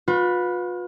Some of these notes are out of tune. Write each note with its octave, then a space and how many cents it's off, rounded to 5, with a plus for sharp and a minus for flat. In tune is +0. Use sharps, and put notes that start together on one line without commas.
F4 +40 B4 +0